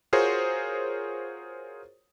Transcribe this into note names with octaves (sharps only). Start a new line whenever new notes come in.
F4 F#4 G#4 A#4 C5 C#5